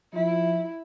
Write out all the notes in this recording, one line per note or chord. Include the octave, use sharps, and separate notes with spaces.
F3 E4